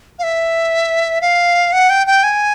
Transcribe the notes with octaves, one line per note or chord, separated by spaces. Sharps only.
F5
E5
F5
F#5
G5
G5
G#5